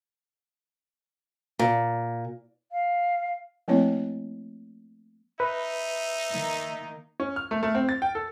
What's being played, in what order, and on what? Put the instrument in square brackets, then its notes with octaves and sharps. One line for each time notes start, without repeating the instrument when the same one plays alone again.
[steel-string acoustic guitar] A#2
[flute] F5
[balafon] F3 A3 A#3 C4 E4 C#5
[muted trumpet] D#4 [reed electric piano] B4 [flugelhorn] E5
[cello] D#3 A#3
[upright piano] C#4
F6
A3
A3
C4
A6
G5
A4